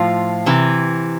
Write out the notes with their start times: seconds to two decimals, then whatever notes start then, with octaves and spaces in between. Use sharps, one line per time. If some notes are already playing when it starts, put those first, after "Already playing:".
Already playing: A2 F3 F4
0.46 C3 E3